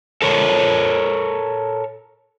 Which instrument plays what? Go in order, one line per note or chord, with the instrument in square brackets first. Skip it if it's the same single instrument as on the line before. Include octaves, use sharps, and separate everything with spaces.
[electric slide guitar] A4 A#4 C#5